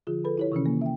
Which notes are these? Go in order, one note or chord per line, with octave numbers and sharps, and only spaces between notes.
D3 F3 F4 G#4
A4 B4 B5
E4 G4 C#5
C3 D#3 E3 C#4
A#3
E5 G5